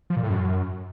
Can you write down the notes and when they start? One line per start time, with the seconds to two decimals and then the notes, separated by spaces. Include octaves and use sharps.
0.10 F3
0.17 A#2
0.23 A2
0.30 F#2